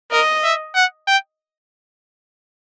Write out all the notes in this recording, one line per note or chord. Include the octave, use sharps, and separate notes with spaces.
A#4 D#5
E5
F#5
G5